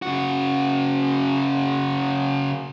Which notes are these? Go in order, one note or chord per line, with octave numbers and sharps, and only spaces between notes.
C#3 F#4